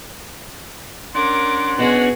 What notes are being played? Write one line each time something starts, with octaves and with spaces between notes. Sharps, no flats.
C#4 D4 A#4 F#5 C6 D6
B2 F#4 G#4